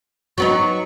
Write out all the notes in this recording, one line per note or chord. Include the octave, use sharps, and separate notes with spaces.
F#3 B3 D#4 C#6